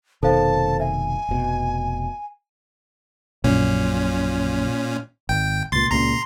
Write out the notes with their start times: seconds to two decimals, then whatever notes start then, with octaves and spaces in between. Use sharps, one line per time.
0.23 F1 B2 D#3 A4 C5 F5 A5
0.80 E5 G#5
1.29 F1 B2
3.44 A#1 F#2 A#2 C#4
5.29 G#1 G5
5.72 C#2 A#2 C6 A6
5.91 C#2 A#2 C#3 A#5 C6